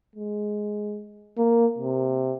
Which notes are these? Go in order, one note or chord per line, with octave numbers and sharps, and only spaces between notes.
G#3
A#3
C3